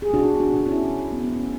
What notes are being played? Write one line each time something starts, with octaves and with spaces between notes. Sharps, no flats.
G#4
B2 D4 F#4
D4 F#4
B2 D4
C#4 E4
B2
B3
A3 C#4